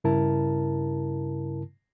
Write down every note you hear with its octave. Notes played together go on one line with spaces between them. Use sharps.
G2 C#3 E4 A#4 A5